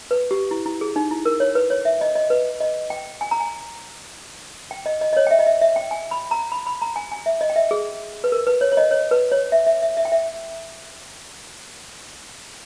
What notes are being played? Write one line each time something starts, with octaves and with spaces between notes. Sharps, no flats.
B4
G4
E4
E4
G#4
D#4
E4
A#4
C#5
B4
C#5
E5
D#5
D#5
B4
D#5
G5
G#5
A#5
G#5
G5
D#5
D#5
D#5
C#5
G5
E5
D#5
E5
E5
G5
G#5
B5
A#5
B5
B5
A#5
G#5
G#5
E5
D#5
G5
E5
G#4
B4
A#4
B4
C#5
C#5
D#5
C#5
B4
C#5
E5
E5
E5
E5
G5
E5